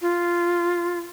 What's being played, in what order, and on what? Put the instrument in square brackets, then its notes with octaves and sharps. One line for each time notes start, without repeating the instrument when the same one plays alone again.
[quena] F4